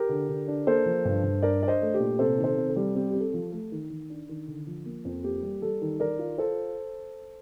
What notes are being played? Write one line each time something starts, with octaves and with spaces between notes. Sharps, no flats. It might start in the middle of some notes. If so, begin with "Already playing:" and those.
Already playing: G4 A#4
D3
D3
D4
A#3 A4 C5
F3
G2
G2
D4 A#4 D5
D4 D5
C5 D#5
A3
G4
A#2
C3 A4 C5
D#3
A4 C5
C3
A4
G3
C4 G4
C4 G4
A4
F3
A3
D#3
D#3
D4
D#3
D3
F3
A#3
F2
A#3 G4
G3
G3 A4
D#3
D#3 A#4 D5
F4
F4 A4 C5